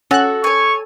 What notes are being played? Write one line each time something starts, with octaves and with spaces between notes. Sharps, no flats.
C#4 F#4 A4 F#6
C#5 G#5 C#6